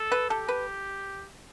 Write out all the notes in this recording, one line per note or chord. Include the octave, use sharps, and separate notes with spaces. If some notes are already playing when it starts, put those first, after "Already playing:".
Already playing: A4
B4
G4 A4
B4